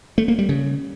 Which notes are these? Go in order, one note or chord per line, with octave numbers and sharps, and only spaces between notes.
A3
A#3
G3
C#3